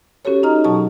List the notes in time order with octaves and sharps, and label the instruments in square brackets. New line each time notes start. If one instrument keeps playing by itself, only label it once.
[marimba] C#4 F#4 G4 A4 C#5
D#4 D#5 A#5 F6
B2 F#3 G#4 A5 C#6